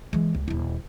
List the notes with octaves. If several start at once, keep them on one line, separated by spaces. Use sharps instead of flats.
E3 G#3
C#2
D#1 E4